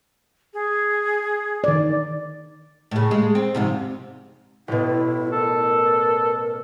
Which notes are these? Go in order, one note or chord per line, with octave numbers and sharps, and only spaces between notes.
G#4
D#3 D5
A2 C#3
G#3
C4
F2 G#2 C3
A1 B2 E4
A4 A#4